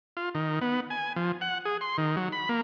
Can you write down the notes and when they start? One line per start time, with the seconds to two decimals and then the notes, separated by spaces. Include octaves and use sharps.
0.17 F4
0.35 D#3
0.61 B3
0.90 G#5
1.16 F3
1.41 F#5
1.65 G#4
1.81 C6
1.98 D#3
2.17 F#3
2.32 B5
2.49 A#3